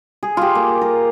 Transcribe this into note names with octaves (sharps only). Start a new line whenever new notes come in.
G#4
F4 G4
A#3
A#4